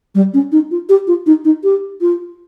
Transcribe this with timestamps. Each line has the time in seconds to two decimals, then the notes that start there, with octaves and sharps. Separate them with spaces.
0.15 G3
0.34 C#4
0.52 D#4
0.71 F4
0.89 G4
1.07 F4
1.26 D#4
1.45 D#4
1.64 G4
2.01 F4